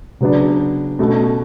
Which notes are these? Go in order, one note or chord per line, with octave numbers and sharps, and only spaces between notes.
C#3 F#3 B3 D4
B2 A3 C#4